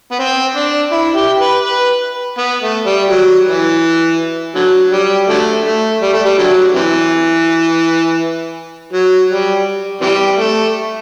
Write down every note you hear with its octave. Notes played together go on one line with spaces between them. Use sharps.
B3
C4
D4
E4
G4
B4
B4
B3
A3
G3
F#3
E3
D3 F#3
G3
D3 F#3 A3
A3
G3
A3
G3
D3 F#3
C3 E3
F#3
G3
C3 E3 G3
A3